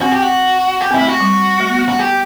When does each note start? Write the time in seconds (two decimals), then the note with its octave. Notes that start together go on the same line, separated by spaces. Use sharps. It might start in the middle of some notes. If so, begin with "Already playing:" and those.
0.01 C4 F#4
0.12 G4
0.22 F#4
0.81 G4
0.91 C4
0.94 E4
1.01 A3
1.07 F#4
1.20 G3
1.60 A3
1.69 B3
1.78 A3
1.89 F#4
1.99 G4